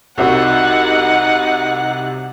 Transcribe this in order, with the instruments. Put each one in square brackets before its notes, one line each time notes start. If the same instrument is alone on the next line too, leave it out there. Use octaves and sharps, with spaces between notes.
[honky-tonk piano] C2 C3 F#4 [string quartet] D#4 F#5